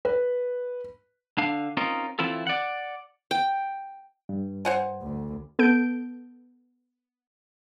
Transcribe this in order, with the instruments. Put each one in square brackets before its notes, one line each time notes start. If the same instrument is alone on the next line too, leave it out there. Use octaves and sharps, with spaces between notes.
[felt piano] B4
[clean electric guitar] D3 D4 F5
C4 C#4 D#4 F4 A#4
E3 C4 E4 F4 A4
D5 F#5
[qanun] G5
[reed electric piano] G2
[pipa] C5 F#5 G#5
[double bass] D2
[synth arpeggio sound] B3 A4 G6 D7